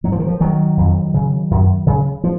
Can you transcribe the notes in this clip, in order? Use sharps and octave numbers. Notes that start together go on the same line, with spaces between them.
G#2 F#3
F3
D#3
F3
D#3 F#3
F2
C#3
F#2
C#3
F3